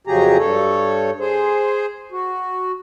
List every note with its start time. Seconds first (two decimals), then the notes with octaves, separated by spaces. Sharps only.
0.07 F2 C#3 F#3 G4 G#4 A#5
0.38 G2 A4 C#5
1.20 G#4 C5
2.12 F#4